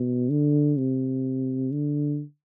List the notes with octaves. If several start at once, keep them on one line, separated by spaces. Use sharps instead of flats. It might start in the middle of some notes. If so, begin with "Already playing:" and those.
Already playing: B2
D3
C3
D3